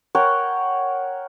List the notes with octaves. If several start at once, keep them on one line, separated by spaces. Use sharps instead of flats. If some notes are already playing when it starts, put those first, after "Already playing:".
A#4 C#5 F#5 G5